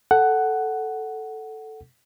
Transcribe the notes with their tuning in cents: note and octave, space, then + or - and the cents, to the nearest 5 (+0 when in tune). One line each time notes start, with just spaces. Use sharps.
A4 +0 F#5 +10